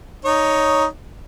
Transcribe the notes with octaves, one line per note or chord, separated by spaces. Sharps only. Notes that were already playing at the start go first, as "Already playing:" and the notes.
D#4 C#5